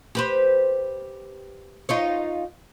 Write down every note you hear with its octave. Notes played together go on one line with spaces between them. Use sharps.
G4 B4 C5
D#4 F4 C#5